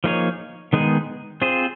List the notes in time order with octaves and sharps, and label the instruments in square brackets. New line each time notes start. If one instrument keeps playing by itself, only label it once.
[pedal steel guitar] F3 A#3 D#4 G#4 C#5
D#3 G#3 B3 D#4 G#4
C4 F4 G#4 C5